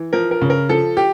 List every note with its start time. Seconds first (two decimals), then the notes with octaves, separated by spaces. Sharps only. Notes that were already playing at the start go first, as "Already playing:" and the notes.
Already playing: E3
0.13 F3 A#4
0.31 A#4
0.41 C#3
0.50 A#4
0.69 F3 A4
0.97 G4